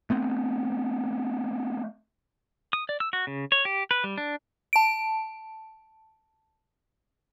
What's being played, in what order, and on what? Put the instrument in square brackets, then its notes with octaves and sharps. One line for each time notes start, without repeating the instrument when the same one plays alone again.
[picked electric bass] A3 B3 C4
[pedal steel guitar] D#6
D5
E6
F#4
C#3
C#5
G4
B4
G3
D4
[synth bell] A5 D7